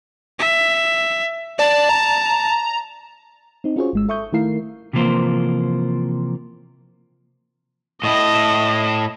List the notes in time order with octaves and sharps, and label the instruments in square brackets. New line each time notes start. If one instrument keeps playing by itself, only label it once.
[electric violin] E5
[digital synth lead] D5 [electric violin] A5
[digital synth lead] A#5
[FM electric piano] C4 D#4
C#4 F4 F#4 G#4 C5 C#5
G#1 G#3 E6
A4 E5 C#6 D#6 G6
D#3 A3 E4 A#4 F5 C7
[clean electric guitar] C3 E3 F3 A#3 C5
[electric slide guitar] A2 E4 [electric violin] D#5